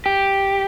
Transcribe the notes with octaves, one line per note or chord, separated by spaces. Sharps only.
G4